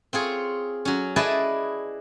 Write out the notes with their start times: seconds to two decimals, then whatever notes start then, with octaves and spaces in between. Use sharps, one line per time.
0.13 C4 F4 G#4 C#5
0.85 F#3 C#4
1.16 E4 G#4 B4 D5 D#5 A5